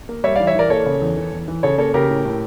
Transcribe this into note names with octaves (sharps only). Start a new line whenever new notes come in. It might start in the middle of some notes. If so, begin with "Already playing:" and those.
A#3
G3 C#5 E5
D5 F5
E3
C#5 E5
E3 A#4 D5
A#3 A4 C#5
C#3
E2
E3
E2
E3
C#3 A4 C#5
A#3 A4 C#5
C#3 G4 A#4
A2
A2